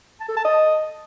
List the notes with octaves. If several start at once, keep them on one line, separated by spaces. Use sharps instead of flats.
A5
A4
A5
D#5